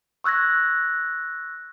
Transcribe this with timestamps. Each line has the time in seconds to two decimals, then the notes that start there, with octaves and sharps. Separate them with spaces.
0.24 C#6 E6 F#6 G#6 A#6